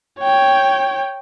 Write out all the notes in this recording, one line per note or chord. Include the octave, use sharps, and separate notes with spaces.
C#5 G5